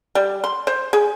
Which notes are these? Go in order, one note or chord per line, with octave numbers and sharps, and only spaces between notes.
G3
C6
C5
G#4